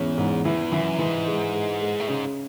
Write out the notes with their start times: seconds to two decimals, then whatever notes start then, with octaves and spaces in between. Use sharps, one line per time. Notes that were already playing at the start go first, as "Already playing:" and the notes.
Already playing: E2 G#2 C#4
0.18 G#2
0.45 E2 E3
0.72 F#2 E3
0.99 G#2 E3
1.27 G#3
1.55 G#3
1.82 G#3
2.00 A2
2.08 G#2 C#3